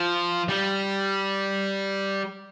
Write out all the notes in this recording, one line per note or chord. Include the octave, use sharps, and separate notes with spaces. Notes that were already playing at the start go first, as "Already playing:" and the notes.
Already playing: F3
G3